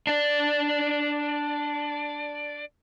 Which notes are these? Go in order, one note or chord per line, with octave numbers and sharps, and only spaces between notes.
D4 D5